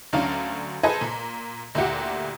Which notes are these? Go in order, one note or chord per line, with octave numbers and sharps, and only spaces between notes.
D2 F#3 C#4 D4 F5
G#4 A4 B4 C5 D#5 G#5
A#2
D2 A#2 E4 G4 F#5